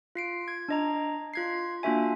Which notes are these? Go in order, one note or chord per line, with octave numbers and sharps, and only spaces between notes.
F4 C7 D7
G#6
D4 D#5 A#5
F4 G#6 C7
A#3 D4 F4 F#4 E5 G#5